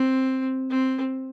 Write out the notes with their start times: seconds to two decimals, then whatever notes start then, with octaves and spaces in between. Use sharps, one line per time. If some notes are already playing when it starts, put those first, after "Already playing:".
Already playing: C4
0.70 C4